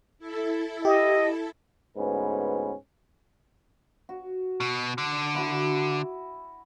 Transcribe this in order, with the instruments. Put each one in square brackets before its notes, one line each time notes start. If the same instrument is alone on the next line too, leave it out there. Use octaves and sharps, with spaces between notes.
[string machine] E4 A4
[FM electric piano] G4 [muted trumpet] D#5
[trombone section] D2 G#2 B3 C#4 B4
[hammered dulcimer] F#4
[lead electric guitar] B2
D3
[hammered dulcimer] E4 F#4 D6